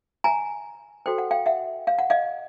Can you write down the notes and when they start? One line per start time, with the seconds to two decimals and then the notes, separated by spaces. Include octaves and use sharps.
0.24 G#5 A#5
1.06 F#4 A4 C5 G5
1.18 F#5
1.31 F5 G5
1.46 E5 F#5
1.87 F5
1.99 F#5
2.10 D#5 F5